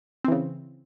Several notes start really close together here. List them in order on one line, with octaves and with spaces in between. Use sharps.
C4 E3 C#3